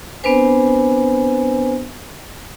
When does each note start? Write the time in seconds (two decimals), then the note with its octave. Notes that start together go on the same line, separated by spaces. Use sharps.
0.23 B3 C4 D4 B4 C5 G#5